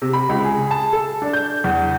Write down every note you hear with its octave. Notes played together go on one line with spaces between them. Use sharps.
C3
B5
C#2
G#4
A5
A4
D4
G6
E2